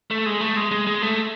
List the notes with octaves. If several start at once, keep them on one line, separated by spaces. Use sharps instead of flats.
A3
G#3
A3
G#3
G#3
G#3
A3